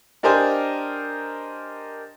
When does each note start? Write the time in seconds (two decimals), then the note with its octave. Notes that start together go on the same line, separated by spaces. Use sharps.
0.23 D4 G4 A#4 C5 D#5 G#5